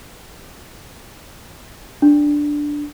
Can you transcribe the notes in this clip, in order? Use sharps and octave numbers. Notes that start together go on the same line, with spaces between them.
D4